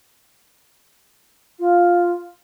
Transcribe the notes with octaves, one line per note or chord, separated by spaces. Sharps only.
F4